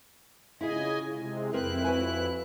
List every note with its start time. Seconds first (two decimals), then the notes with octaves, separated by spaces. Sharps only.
0.61 C#3 E4 F4 G#4 D#5 G#5
1.09 C3 G#3
1.53 F2 C4 E4 A#4 B4 F#6
1.84 F#4 B4 G#5